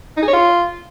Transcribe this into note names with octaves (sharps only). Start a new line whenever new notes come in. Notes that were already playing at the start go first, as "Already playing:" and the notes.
D#4
G#4
C#5
F4